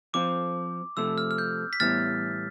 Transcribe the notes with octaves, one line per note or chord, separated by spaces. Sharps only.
F3 C4 F4 D6
C3 F3 A3 E6
F6
F6
G6
B6
A2 E3 G3 B3 E4 F6 A6